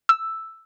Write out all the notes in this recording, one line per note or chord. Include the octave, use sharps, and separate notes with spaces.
E6